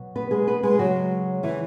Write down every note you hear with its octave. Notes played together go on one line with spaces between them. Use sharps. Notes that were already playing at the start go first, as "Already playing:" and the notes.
Already playing: B2 F#3
B3 B4
G#3 G#4
B3 B4
G#3 G#4
C#3 F#3 G#3 F#4
E3 E4